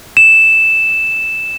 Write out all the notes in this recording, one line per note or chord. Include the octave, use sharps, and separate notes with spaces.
E7